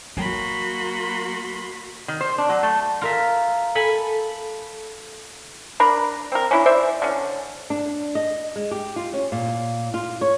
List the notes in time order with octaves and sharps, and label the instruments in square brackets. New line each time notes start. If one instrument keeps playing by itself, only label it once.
[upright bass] F#3 [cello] A#3 F#4 [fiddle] B5 C6
[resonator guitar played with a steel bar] D#3
C5
D4
F#3
A3
[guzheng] F4 A#4 E5
A4 G#5 B5
[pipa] D4 A#4 A#5 B5
C4 A#4
C#4 D4 E4
C5 D5 E5
D3 C#4
[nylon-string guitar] D4
D#5
G#3
G4
F4
C#4
A#2
F4
C#5